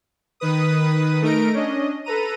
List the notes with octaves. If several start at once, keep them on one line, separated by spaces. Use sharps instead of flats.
D#3 B4 D#6
A3 D#4 A#4 A#5 D7
C#4 D4 D#5
A4 B4 A#5 D#7